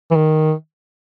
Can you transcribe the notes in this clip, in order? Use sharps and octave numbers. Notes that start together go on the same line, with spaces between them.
E3
D#3